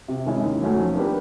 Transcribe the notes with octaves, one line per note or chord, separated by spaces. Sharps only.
C3
D#3 G#3 C#4 E4
D#2
D#3 F#3 A3 C#4
F3
A#3 D4 G4 B4